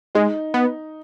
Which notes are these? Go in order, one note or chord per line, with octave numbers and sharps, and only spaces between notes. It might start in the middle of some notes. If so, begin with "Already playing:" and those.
G#3 D#4
B3